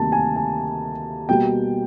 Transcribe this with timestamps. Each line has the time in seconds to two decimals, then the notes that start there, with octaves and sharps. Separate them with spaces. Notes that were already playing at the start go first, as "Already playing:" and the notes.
Already playing: D2 C3 D#3 G3 A#3 A5
0.12 G#5
0.36 G#5
1.29 B2 G3 A#3 G5